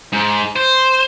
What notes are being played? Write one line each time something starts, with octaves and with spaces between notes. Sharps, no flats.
G#2
C5